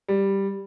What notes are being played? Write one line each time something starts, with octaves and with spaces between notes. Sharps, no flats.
G3